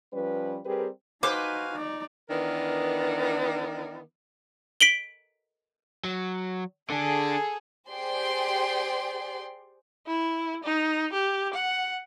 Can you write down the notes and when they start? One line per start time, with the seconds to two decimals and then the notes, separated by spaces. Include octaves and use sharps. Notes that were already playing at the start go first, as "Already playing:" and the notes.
0.13 F3 G3 C#4 B4
0.65 G3 C4 G4 G#4 A#4 B4
1.23 D#4 F#4 B4 C5 F5 G#5 D6
1.74 D#4 D5
2.29 D#3 E3 B3 D4 A#4
4.81 B6 D7 F#7 G7
6.04 F#3
6.90 D3 D4 G#4 A4
7.90 G4 G#4 C5 D5 G5 C6
10.07 E4
10.63 D#4
11.13 G4
11.53 F#5